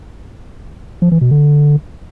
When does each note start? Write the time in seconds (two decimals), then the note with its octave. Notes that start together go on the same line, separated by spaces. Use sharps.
1.02 F3
1.12 E3
1.21 B2
1.31 D3